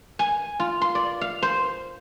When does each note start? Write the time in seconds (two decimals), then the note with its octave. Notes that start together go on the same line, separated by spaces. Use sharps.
0.19 G#5
0.60 F4
0.81 C6
0.95 D5
1.21 F5
1.42 C5